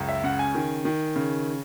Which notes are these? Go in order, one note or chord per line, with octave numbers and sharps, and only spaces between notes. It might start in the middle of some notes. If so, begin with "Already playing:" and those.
Already playing: C#2 F#2
E5
C#3 F#5
G#5
D#3
D#3
C#3